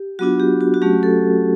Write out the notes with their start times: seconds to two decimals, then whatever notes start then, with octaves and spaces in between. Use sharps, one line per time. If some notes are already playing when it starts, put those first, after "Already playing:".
Already playing: G4
0.19 F#3 B3 D4 F4 F#4
0.40 G4
0.61 F#4
0.74 F#4
0.82 F#3 A3 C#4 G4
1.03 A4